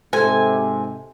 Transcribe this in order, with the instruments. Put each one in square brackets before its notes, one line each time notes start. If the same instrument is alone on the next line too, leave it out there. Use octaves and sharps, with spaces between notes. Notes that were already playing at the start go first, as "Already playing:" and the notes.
[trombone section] G#2 C3 [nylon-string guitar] A4 C5 [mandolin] G#5